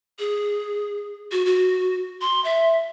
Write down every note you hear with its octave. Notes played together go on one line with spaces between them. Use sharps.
G#4
F#4
F#4
C6
E5